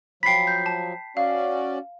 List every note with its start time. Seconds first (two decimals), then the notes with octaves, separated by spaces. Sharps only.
0.23 F3 F#3 G5 B5 B6 C7
0.47 G6
0.66 A5
1.17 C#4 F#4 D5 F5